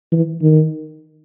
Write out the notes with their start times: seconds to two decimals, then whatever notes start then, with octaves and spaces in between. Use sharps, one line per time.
0.12 E3
0.42 D#3